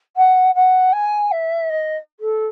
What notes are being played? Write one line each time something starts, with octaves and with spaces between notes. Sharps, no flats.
F#5
F#5
G#5
E5
D#5
A4